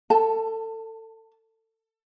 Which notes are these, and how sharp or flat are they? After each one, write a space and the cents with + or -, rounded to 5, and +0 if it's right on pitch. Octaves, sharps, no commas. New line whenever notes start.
A4 +25 A5 +0